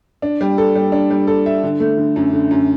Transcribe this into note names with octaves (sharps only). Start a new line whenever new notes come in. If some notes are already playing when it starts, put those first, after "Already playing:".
D4
G3
A4
G3
D4
G3
A4
E5
D3
A3
D3
F#2
D3
F#2